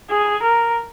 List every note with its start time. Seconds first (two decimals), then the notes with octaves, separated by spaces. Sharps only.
0.10 G#4
0.42 A#4